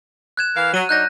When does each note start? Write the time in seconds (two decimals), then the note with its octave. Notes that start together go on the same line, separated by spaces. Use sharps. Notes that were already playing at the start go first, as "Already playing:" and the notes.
0.37 F#6 G#6 E7
0.56 E3 A#4 F5
0.74 F#3 D#7
0.89 F#3 D4 D#4 F#6 G6 A#6